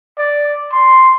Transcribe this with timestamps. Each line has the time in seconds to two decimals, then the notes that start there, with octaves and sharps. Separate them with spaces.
0.18 D5
0.73 C6